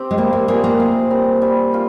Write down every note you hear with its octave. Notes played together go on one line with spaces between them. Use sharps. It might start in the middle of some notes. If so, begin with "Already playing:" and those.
Already playing: C3 C4 G4
G#3
G3 A#3
A#3
A#3 C4 F4 G#4
A#3
C3
G3 C4
G3
C4 F4